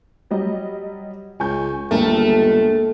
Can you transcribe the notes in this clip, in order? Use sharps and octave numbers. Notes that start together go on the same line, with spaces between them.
F#3 G3 D#5
C#2 G#5 C#6 G6
G1 D#2 G#3 A3 A4 A#4